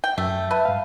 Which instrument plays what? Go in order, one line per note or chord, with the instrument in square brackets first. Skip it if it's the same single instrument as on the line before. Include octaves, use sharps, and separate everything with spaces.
[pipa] G5
[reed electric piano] F#2 [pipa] A3
[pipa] B4 [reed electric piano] E5 A5
[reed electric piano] G2 F5